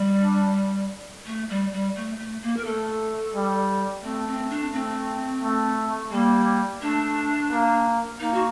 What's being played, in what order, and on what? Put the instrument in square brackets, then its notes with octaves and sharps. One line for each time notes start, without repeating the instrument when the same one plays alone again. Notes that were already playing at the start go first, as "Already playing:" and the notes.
Already playing: [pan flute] G3
[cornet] D4
[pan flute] A3
G3
G3
A3
A3
A#3
A#4
[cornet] A3 [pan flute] A4
[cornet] G3
[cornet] A3 [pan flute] C4
[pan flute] C4
D4
[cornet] A3 [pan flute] C4
[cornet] A3
[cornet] G3 [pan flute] A#3
[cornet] A3 [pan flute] D4
[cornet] A#3
[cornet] A#3 [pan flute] D#4
[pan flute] F#4